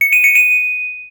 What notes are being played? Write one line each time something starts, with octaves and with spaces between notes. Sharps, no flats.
C#7
D#7
C#7
D#7